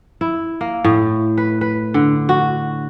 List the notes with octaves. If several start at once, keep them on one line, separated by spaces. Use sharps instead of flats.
E4
A#3
A2
B4
B4
D3
F#4